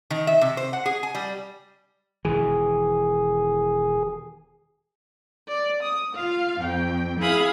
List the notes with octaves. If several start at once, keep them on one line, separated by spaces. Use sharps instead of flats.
D#3
E5
C3
C5
F#5
G#4
G#5
G3
E1 D#3 E3 G#4
D5
D#6
F4 F5
F2 G5
E4 G#4 F5 B5 D#6